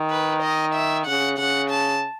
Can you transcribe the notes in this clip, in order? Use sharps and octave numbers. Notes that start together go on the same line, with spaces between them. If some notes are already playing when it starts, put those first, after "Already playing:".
Already playing: D#3
B4
D#5
E5
C#3 F#5
C#3 F#5
A5